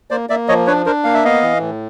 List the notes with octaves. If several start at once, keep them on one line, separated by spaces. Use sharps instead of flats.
A#3 C5 D5
A#3 D5 E5
F3 C#5 D#5
D4 B4 C#5
D4 A#4 C5
A#3 F5
E5
B3 D#5 F5
E3
A2